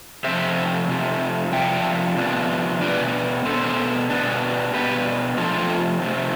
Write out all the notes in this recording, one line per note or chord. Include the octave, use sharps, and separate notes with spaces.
C3 F3 A3 C5 E5
C3 F3 A3
C3 F3 B3 D4 E5 G5
C3 F3 B3 D4
B2 B3 D4 B4 D5
B2 B3 D4 A4 C5
B2 B3 D4
B2 B3 D4 G4 B4
C3 F3 A3 C4 F4 A4
C3 F3 A3 C4